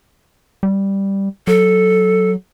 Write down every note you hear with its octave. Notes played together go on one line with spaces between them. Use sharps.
G3
F#3 A4